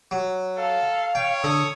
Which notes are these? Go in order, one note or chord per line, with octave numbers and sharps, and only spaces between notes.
F#3
A4 F5
C#5 G5
D3 A4 D#6